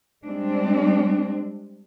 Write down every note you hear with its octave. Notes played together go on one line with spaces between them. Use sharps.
G3 G#3 C4 D4